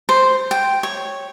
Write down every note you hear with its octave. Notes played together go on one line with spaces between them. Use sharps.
C5
G5
C#5